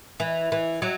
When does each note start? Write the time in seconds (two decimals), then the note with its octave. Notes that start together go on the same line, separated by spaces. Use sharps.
0.20 E3
0.52 E3
0.82 F#3